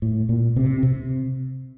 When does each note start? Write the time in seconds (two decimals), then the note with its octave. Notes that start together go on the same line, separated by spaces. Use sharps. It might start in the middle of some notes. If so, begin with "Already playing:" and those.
0.02 A2
0.29 A#2
0.56 C3
0.83 C3